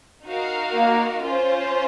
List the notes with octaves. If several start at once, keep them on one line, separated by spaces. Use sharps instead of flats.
D#4 F#4 A#4 F5
A#3
C#4 F4 C5